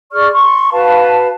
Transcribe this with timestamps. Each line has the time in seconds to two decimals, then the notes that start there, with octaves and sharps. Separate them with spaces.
0.13 G#4 D5 C#6 F6
0.32 C6 C#6
0.72 F#4 B4 F5 A5